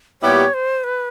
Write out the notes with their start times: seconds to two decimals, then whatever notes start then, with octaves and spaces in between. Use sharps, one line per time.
0.22 A#2 G3 B3 E4 G4 C#5
0.54 C5
0.84 B4